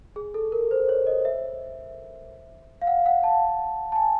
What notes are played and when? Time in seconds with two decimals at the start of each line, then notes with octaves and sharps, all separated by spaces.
0.16 G#4
0.34 A4
0.52 A#4
0.71 C5
0.89 C#5
1.07 D#5
1.25 E5
2.81 F5
2.87 F#5
3.06 F#5
3.23 A5
3.92 A5
3.96 G#5